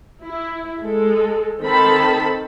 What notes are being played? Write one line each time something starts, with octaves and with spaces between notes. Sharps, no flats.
E4
G#3 A4
D#3 C4 A4 A5 B5